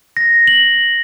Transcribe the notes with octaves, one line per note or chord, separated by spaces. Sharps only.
A#6
F#7